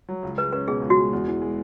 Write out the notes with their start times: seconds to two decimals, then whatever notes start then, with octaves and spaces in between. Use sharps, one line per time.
0.09 F#3
0.23 C#2
0.38 G#3 B4
0.53 C#4 B4
0.68 B2 G#4
0.82 C#2
0.90 F#4
0.97 G#3
1.13 E2
1.28 E3
1.42 G#3